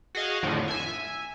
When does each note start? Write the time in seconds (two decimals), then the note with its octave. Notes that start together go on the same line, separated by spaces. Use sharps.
0.15 F#4 G#4 D#5 F5
0.43 F2 A2 D3 D#3
0.68 E5 G#5